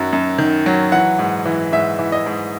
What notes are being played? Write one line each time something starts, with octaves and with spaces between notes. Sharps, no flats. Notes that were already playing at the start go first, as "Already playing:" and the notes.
Already playing: F#2 D#3 F#3
F#2
D#3
F#3
E3 F#5
G#2
E3
G#2 E5
E3
D#5
G#2